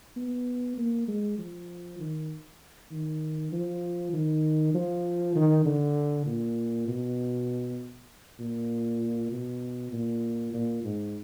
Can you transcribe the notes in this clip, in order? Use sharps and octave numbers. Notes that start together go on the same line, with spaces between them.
B3
A#3
G#3
F3
D#3
D#3
F3
D#3
F3
D#3
D3
A#2
B2
A#2
B2
A#2
A#2
G#2